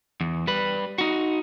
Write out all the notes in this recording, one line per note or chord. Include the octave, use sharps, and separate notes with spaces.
E2
G3 B4
D#4 F#4